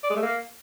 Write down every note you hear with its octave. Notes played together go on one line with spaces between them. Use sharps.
D5
G#3
A3
A#3